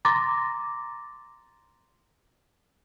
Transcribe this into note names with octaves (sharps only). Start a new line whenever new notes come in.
A#5 C6 D6 A6 A#6